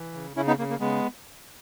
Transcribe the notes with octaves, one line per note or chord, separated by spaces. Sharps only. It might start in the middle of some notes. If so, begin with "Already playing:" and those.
Already playing: E3
C#3
C#3 C#4 E4
B3 D#4
C#3 A#3
A#3
C#3 G#3 B3